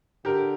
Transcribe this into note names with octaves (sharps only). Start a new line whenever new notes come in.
D3 G4 A#4